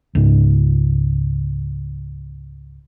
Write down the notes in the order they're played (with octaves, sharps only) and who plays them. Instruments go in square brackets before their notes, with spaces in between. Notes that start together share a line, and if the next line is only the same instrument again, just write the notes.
[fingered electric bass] C#2 G#2